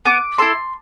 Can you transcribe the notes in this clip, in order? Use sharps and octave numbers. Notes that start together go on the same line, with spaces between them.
B3 D6
E4 A4 C6